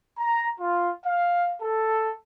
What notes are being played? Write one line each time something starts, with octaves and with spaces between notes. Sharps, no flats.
A#5
F4
F5
A4